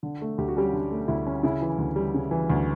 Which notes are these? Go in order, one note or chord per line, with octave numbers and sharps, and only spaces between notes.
D3
A3
D2 G4
F#4
G3 C#4 G4
D3
A3
D2 E4
C#4
C#3 E4
E3
D2
G3
C#3
E3
D2